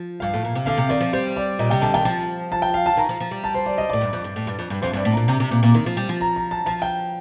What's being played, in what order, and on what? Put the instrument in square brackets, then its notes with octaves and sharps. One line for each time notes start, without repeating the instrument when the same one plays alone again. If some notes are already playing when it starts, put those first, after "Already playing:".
Already playing: [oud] F3
[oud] G2 [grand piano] F5
[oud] A2
A#2
C3
[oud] D3 [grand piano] F5
[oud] C3
[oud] D#3 [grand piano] D5
[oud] F3
[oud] G3 [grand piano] C5
[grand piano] D5
[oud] A#2 [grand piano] D#5
[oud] C3 [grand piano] G5
[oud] D3 [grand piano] A5
[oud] D#3 [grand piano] G5
[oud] F3 [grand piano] A5
[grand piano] A5
G5
F5
A5
[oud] D#3 [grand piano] A#5
[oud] F3
F3
G3
[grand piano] A5
C5
D5
D#5
[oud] A2 [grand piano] D5
[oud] G2
F2
G2
A2
G2
F2
G2
[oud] F2 [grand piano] C5
[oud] G2 [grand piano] D5
[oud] A2
[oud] A#2 [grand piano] A#5
[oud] C3
C3
A#2
A#2
D#3
F3
G3
F3
[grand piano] A#5
A#5
A5
[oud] F3 [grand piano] A5
[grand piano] G5